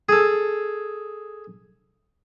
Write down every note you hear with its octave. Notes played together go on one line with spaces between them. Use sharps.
G#4 A4